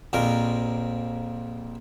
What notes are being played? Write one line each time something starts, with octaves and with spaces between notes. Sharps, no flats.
A#1 F2 A#2 A#4